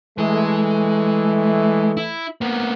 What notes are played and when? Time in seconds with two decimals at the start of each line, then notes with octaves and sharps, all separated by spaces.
0.18 E3 G#3 A3
1.97 E4
2.41 A#3 B3